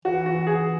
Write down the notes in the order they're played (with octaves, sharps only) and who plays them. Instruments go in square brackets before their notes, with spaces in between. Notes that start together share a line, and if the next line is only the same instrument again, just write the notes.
[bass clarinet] E3 [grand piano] F#4
[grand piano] F#4
G#4